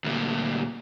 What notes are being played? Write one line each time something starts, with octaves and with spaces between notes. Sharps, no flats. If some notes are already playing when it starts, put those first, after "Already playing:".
D2 A#2